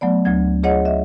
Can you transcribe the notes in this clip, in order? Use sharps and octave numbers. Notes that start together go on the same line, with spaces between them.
F#3 A3 B3 D5
D2 F#3 G#6
F4 G#4 C#5 D#5 F#5
D#5 E5